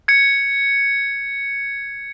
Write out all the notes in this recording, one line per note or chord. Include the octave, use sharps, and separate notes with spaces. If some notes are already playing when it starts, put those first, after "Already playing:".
G#6 C#7